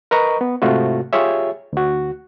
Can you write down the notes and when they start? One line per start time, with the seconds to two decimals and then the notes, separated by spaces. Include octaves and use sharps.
0.11 A#4 B4 D#5 A#5 C#6
0.41 B3
0.62 G#2 C3 A3 F4 F#4
1.13 F4 G4 G#4 C#5 E5
1.73 D2 F#4